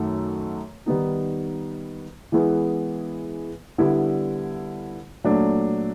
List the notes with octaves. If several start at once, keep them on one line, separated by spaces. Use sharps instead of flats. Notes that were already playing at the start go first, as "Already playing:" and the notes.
Already playing: F#2 D#3 F#3 A3
D#3 G3 B3 D#4
E3 G#3 B3 E4 G#4
D3 G3 B3 E4
A#2 F#3 A3 D4